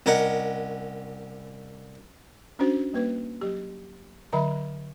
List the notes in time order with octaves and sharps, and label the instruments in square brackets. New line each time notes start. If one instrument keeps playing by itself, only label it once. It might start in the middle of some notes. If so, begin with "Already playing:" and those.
[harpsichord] C2 C#4 A#4 D#5 F#5
[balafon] C#4 D4 F#4 C5
G3 A#3 B4
F#3 G4
D3 F#3 E5 B5